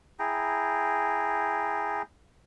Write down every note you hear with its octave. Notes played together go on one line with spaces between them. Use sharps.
E4 G#4 G5 A#5